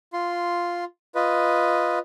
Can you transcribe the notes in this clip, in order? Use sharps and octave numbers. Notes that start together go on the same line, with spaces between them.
F4 C6
F4 B4 D#5